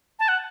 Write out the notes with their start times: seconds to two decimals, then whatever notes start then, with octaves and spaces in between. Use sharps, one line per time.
0.19 A5
0.28 F#5